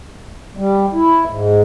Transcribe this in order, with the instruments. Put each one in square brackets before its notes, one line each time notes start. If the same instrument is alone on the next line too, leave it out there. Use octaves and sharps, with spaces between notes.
[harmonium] G3
E4
G#2